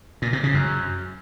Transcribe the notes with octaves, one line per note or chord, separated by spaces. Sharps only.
A#2
C3
C#3
F#2